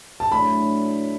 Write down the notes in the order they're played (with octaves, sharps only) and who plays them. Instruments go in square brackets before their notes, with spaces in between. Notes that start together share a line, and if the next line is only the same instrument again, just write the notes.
[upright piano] A5
[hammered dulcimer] A2 F#3 D4 [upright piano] B5